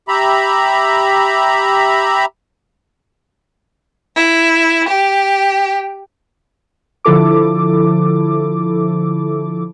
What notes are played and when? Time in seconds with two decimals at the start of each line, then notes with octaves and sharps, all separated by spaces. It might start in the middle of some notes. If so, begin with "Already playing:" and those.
0.08 G4 E5 A#5 B5
4.16 E4
4.89 G4
7.05 D3 F3 E4 A4 D6